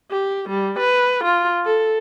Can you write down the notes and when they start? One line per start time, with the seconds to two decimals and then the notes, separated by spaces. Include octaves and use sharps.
0.11 G4
0.50 G3
0.80 B4
1.24 F4
1.66 A4